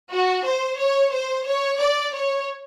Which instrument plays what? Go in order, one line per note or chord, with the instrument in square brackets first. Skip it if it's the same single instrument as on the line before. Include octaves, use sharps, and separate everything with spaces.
[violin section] F#4
C5
C#5
C5
C#5
D5
C#5